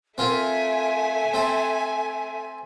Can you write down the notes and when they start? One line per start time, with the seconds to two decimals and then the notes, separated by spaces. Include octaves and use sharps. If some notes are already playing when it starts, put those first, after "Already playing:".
0.18 A3 C4 F4 A#4 E5 G#5
1.34 C4 A4